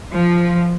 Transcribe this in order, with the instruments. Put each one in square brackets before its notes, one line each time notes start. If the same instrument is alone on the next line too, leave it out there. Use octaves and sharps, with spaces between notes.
[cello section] F3